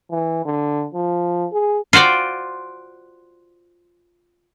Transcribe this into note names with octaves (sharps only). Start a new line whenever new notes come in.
E3
D3
F3
G#4
F4 F#4 C5 D5 G5